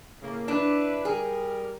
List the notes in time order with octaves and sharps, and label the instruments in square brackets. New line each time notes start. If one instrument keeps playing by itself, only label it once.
[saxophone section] A2 C#3 A#3
[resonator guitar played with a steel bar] D4 [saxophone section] E4 B4
[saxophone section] G3 A#4 [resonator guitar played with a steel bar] G#4